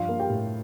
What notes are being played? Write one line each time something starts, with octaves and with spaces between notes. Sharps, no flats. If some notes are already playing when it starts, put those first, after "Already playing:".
Already playing: G2 F3 F4 F5
A#3
G4 G5
A2